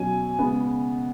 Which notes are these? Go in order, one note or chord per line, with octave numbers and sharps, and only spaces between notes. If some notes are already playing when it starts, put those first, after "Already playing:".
Already playing: B2 F#3 C#4 G#5
C#3 G#3 B3